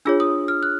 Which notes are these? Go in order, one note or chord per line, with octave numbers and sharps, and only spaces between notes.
D4 F4 G#4 C#5 E6
D#6
F6
F#6